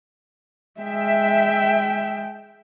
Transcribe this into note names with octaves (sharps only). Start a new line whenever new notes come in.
G#3 E5 G5